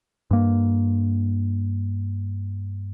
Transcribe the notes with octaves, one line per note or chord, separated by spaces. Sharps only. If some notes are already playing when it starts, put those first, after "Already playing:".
G2 A#3